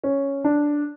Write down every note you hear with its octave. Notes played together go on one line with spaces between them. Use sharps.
C#4
D4